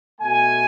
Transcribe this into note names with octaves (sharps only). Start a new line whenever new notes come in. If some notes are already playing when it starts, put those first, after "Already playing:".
B2 A3 G#5